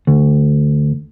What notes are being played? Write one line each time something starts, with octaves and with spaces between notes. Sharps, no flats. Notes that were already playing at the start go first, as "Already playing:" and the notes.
D2